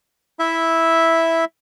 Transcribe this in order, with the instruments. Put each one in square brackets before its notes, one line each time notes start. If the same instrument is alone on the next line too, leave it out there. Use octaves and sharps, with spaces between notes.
[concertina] E4 E5